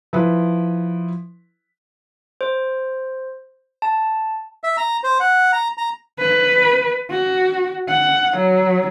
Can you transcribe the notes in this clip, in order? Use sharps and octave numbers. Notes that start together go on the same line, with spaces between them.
F3 E4 B4
C5
A5
E5
A#5
C5
F#5
A#5
A#5
B4
F#4
F#5
F#3